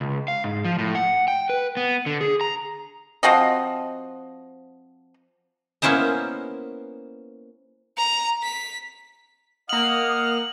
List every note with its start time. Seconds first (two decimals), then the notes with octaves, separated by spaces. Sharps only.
0.01 C#2
0.28 F5
0.44 G#2
0.65 F3
0.78 A2
0.95 F#5
1.28 G5
1.50 B4
1.77 B3
2.06 D3
2.21 G#4
2.41 A#5
3.23 F3 C4 F#4 D#5
5.82 A#3 B3 C#4 E4 C5 D#5
7.97 A#5
8.43 B6
9.69 A#3 D#5 F5 F#5 D#6 F6 F#7